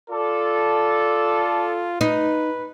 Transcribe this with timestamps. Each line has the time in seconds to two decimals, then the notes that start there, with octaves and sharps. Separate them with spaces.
0.11 F4 A4 D5
2.01 D#4 B4